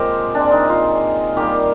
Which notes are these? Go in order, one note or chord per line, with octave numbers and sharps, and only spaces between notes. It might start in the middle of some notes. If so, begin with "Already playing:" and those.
Already playing: A#2 F3 G#3 C4 G4 A#4 C5
A#2 G#3 C4 D4
D#4
F4
D#3 G3 A#3 G4